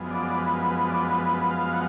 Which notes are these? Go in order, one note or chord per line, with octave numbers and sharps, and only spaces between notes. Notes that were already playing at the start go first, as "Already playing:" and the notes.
Already playing: F#2 F3 G#3 B3
D5
B4
B4
B4
D5
B4
F5
F#5